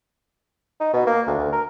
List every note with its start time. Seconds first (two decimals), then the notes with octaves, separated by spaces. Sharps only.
0.80 D#4
0.93 B2
1.06 A#3
1.27 D2
1.39 D2
1.52 A#4